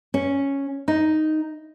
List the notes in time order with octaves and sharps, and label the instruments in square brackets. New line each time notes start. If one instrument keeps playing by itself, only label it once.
[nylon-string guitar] C#4
D#4